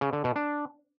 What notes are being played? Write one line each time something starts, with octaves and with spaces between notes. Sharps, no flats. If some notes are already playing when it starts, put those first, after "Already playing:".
C#3
D3
B2
D4